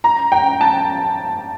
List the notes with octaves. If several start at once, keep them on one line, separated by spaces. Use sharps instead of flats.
A#5
G5
A5